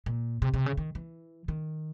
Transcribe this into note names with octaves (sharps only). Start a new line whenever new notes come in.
A#2
C3
C3
C#3
D#3
E3
D#3